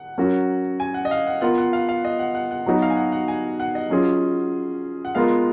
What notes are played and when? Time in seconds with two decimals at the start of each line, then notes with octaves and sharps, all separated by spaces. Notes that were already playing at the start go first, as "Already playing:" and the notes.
Already playing: F#5
0.18 F#3 C#4 F#4 A#4
0.80 G#5
0.94 F#5
1.05 D#5
1.11 F5
1.27 F#5
1.41 B3 F4 A#4 F#5
1.58 F#5
1.73 F5
1.89 F5
2.04 D#5
2.19 F#5
2.35 F#5
2.51 F#5
2.66 F#3 B3 D#4 F#4
2.82 F5
2.90 G#5
2.97 F#5
3.12 F#5
3.28 G#5
3.60 F#5
3.75 D#5
3.90 F#3 C#4 F4 G#4
5.05 F#5
5.15 G#3 B3 F4 A#4 F5